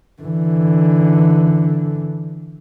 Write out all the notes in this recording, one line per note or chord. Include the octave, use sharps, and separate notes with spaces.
D3 E3